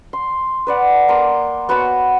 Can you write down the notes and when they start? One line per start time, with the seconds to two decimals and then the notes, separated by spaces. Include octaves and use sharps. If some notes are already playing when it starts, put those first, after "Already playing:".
0.13 C6
0.67 B4 D5 F#5
1.09 A#3 A#5 C6
1.69 B3 F#4 C#5 A5